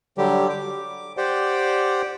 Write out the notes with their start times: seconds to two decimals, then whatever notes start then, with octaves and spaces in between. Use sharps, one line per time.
0.18 D3 F#3 G3 G4
0.49 D6
1.17 G4 C5 D5 F#5 G5